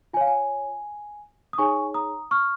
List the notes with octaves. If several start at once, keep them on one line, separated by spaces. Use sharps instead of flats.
F4 C#5 F5 G#5
G#5
D#6
D#4 G#4 C#5 G#5 C#6
A#5 D#6
C#6 F6